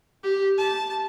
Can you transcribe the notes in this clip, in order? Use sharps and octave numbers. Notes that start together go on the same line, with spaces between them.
G4
A5